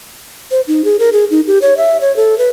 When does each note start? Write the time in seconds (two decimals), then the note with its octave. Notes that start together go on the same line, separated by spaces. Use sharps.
0.51 C5
0.68 D#4
0.85 G#4
0.99 A#4
1.13 G#4
1.31 D#4
1.47 G4
1.62 C#5
1.77 E5
2.01 C#5
2.16 A4
2.38 B4